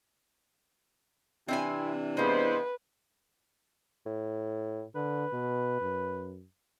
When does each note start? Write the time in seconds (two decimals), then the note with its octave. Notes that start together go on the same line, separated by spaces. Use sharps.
1.48 C3 E3 C4 D4 E4 G#5
2.17 G#3 A#3 B3 E4 B4 C5
4.06 A2
4.95 D3 B4
5.33 B2
5.81 F#2